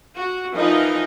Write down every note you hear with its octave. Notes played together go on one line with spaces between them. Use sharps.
F#4
E3 F3 D#4 A#4 D#5